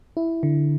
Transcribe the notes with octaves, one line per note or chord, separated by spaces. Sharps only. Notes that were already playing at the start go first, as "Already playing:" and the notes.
E4
D3